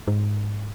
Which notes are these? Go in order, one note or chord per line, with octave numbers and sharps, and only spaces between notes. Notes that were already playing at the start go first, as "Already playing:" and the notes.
G#2